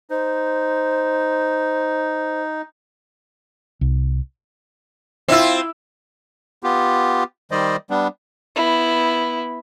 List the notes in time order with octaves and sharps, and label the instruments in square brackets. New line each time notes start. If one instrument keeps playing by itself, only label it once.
[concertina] D#4 [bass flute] C5
[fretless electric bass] C2
[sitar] C4 F4 [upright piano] E4 E5 E6
[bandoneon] B3 F4 G4
D#3 G3 C5 D5 D#5
G3 B3 D4
[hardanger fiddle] B3 E4